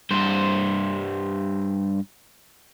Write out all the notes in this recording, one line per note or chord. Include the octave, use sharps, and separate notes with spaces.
G2 C5